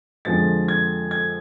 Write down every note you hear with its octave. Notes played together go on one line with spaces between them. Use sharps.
F2 D3 F3 G#3 A6
G#6
G#6